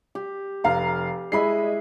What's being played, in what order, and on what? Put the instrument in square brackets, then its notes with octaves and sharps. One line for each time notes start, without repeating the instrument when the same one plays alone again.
[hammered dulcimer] G4
[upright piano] F1 F5 A#5
[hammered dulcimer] G#3 E4 E5 [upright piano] D#5 B5 C7